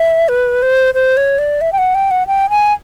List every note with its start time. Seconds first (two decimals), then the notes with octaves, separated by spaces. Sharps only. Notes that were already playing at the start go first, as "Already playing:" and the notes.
Already playing: E5
0.29 B4
0.62 C5
0.94 C5
1.17 C#5
1.39 D5
1.61 E5
1.73 G5
1.78 F#5
1.95 G5
2.11 F#5
2.27 G5
2.50 G#5